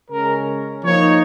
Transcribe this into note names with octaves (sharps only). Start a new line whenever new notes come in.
C#3 G#3 C#4 A#4
F3 A#3 D#4 C#5